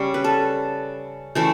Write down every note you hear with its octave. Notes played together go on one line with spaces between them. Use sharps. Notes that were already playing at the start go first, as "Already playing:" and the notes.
Already playing: C#3 G3 C#4 C#5
B4
A4
C#3 E3 A3